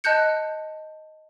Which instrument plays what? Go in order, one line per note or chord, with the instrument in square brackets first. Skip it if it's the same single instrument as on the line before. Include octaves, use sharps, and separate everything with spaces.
[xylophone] D#5 A5 F#6 G6 C#7